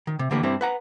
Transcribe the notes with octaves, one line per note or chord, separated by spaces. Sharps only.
D#3
C3
D3 E3 A#3 G4 A#4 B4
G2 G3 C4 E4
B4 F#5 A#5